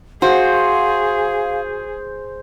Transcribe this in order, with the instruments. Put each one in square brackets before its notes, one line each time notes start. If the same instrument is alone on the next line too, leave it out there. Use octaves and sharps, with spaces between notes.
[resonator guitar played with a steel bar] F#4 [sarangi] G#4 [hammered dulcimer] C5 [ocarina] F5